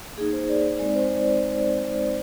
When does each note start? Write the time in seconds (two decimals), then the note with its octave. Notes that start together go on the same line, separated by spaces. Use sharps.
0.17 A#3 D#4 G#4
0.33 C5
0.49 D5
0.79 G#3 C4 D#4 D5
0.95 C5
1.10 D5